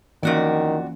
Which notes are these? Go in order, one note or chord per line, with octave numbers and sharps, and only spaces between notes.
F2 D#3 E3 A#3 C#4 F#4 D5